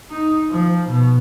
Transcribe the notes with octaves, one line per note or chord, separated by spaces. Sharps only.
D#4
F3
B2